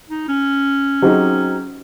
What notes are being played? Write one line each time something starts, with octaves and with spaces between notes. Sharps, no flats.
D#4
C#4
F#3 C4 D#4 G#4